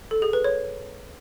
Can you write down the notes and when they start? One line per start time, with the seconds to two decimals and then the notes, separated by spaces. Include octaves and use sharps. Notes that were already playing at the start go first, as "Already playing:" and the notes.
0.11 A4
0.22 G#4
0.33 B4
0.44 C#5